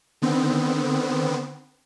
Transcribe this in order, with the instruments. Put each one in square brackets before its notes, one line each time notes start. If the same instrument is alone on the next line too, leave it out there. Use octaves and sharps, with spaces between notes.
[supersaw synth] D3 D#3 B3 C4